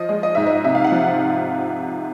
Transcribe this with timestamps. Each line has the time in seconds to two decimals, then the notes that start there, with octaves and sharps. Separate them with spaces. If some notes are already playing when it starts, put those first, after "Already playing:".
Already playing: F3 D#5
0.09 G#3
0.23 D#5
0.35 G#2 E5
0.47 D#5
0.64 C3 E5
0.75 F5
0.84 F#5
0.92 F3